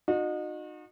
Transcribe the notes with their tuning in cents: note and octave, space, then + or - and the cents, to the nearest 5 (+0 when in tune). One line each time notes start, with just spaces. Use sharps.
D#4 -30 F#4 -40